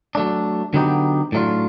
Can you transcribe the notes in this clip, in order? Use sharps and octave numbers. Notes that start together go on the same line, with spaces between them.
F#3 A3 D4
D3 F#3 B3 D#4 G4
A2 F#3 A3 D4 F4